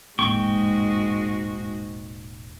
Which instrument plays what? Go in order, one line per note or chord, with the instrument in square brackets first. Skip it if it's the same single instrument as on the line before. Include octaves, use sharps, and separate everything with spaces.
[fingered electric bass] E1 A#3 [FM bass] A1 [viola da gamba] G#2 G#3 F#4 [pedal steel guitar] G5 C#6